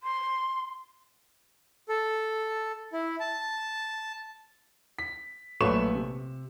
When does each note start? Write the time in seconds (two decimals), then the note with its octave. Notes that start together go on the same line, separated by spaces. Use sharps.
0.03 C6
1.89 A4
2.93 E4
3.20 A5
4.99 B6
5.61 A#1 F#3 A3 B4 C#6 E7
5.95 C3